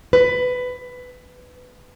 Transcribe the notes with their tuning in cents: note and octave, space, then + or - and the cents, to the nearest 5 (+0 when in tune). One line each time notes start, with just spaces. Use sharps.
B4 +15